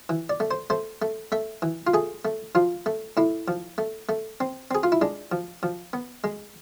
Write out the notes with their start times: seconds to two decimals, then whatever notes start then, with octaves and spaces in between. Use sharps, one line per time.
0.09 E3
0.30 D5
0.40 A3
0.51 C5
0.70 A3 C5
1.02 A3
1.32 A3 E5
1.62 E3
1.87 F4
1.94 A3 G#4
2.25 A3
2.55 F3 F4
2.86 A3
3.17 A2 E4
3.48 F3
3.78 A3
4.09 A3
4.40 C4
4.71 C4 G#4
4.83 F4
4.92 E4
5.02 G#3 D4
5.32 F3
5.63 F3
5.93 B3
6.24 G#3